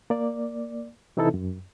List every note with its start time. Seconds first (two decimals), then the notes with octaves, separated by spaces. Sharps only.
0.10 A#3 D5
1.17 C3 E3 C4 D#4 E4 A4
1.34 F#2